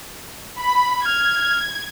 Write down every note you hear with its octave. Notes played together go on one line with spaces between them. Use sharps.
B5
F6 G#6